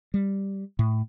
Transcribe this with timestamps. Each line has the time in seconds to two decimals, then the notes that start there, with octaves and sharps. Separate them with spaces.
0.14 G3
0.79 A2